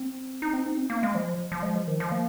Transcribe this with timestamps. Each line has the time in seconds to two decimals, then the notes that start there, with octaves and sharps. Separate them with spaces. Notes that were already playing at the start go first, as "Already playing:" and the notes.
Already playing: C4
0.42 D#4
0.54 C4
0.66 D#4
0.78 C4
0.90 A#3
1.03 G#3
1.15 F3
1.52 F3
1.63 G#3
1.76 F3
1.88 D#3
2.00 F3
2.12 A#3